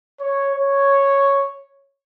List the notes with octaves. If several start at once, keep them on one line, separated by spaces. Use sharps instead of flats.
C#5
C#5